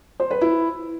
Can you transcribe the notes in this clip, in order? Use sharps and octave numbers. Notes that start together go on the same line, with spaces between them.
C5
B4
E4